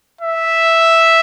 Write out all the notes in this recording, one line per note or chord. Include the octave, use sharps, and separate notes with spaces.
E5